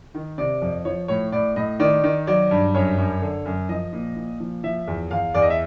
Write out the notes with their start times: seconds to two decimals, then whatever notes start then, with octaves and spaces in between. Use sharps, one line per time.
0.15 D#3
0.38 C3 D5
0.62 F2
0.85 F3 C#5
1.08 A2 C#5
1.32 A2 D5
1.56 A2 D#5
1.80 D#3 D5
2.04 D#3
2.27 F#3 D5
2.51 G2
2.75 F#2 C#5
2.98 F#2
3.22 D3
3.46 F#2
3.69 F3 D#5
3.93 A#2
4.16 A#2
4.40 F3
4.63 F3 E5
4.87 E2
5.11 E2 F5
5.34 E2 D5
5.42 D#5
5.50 E5